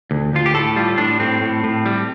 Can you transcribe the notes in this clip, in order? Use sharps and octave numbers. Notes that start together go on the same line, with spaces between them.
D2
D2 F4
G4
A2 A4
G3 F4
A2 D4
A2 C4
A2
A2
G3